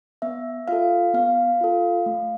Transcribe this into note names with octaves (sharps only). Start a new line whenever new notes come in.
B3 E5
F4 A4 F5
B3 F5
F4 A4
A3